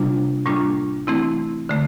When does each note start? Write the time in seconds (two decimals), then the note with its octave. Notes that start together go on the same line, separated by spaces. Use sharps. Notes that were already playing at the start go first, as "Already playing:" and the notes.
Already playing: C3 G3 A#3 D4 F4
0.46 A2 G3 A#3 D4 F4
1.07 E3 A3 C4 E4
1.69 D3 A3